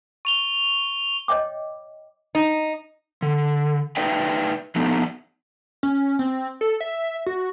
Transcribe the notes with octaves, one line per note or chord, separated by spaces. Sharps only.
C#6 F7 G7
C#5 D#5 E5 G5 D6
D#4
D3
D#4 B4 D5 E5 G5
F3 A3 B3 D4 D#4
C#4
C4
A4
E5
F#4